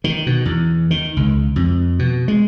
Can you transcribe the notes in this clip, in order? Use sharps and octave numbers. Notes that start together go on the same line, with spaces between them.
D#3
B2
E2
D#3
C#2
F2
B2
G#3